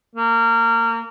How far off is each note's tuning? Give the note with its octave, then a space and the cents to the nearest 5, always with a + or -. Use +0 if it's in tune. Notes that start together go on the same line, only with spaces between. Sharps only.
A#3 -25